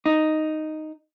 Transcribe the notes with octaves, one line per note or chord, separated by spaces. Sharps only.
D#4